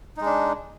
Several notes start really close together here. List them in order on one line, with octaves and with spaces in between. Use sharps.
D#4 G#3 D4